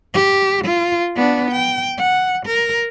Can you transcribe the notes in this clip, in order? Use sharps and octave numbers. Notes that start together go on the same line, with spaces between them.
G4
F4
B3 D4
G5
F#5
A#4